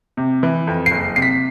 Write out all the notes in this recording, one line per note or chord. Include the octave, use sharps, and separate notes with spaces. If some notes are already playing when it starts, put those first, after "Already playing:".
C3
E3
F2
C7
F#1
C3 C7
B6